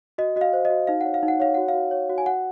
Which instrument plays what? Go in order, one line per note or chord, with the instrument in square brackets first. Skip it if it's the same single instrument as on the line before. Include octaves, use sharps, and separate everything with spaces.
[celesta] F#4 D#5
F#4 D#5
F5
C5
D#5
F#4
D#4 F5
C#5 F#5
F5
D#4
F#5
C#5 F5
F#4 F#5
F5
F#4
C#5
F#4
G#5
F#4 F#5